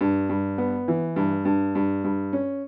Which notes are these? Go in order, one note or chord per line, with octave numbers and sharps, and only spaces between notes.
G2
G2
B3
E3
G2
G2
G2
G2
C#4